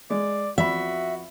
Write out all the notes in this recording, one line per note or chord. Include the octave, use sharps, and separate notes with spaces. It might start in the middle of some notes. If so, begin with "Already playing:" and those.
G#3 D5
F2 F#4 E5 B5